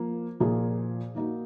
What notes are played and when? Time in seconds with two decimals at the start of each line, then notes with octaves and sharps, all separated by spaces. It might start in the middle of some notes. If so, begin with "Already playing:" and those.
Already playing: F3 A#3 F4
0.40 A#2 F3 A#3 F4 G#4
1.15 D#3 A#3 D#4 F#4